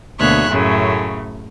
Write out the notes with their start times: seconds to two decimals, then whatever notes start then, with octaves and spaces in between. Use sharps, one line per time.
0.18 D2 B2 A#3 C#5 E5 F#6
0.49 F#2 A2 C#3 A3